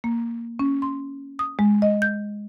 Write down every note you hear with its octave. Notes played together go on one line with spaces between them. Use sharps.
A#3
C#4
C6
D#6
G#3
D#5
G6